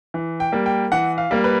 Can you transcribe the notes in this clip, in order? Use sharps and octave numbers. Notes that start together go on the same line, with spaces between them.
E3
G5
G3 A#3
G5
E3 F#5
F5
G3 A#3
B4